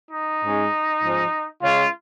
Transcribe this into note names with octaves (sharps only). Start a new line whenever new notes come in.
D#4
G#2 G#3 C#4
G#2 F3 C#4
C#3 G#3 C#4 F4